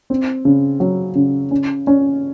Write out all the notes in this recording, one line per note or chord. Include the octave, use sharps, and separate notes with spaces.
C4
C#3
F#3
C#3
C#4
C#4